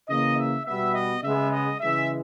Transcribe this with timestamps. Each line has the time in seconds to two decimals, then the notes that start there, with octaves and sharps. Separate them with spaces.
0.09 C#3 E3 A#3 D#5
0.37 E5
0.66 B2 G3 B3 E5
0.94 D#5
1.23 C#3 G#3 B3 E5
1.52 D#5
1.81 C#3 E3 G#3 E5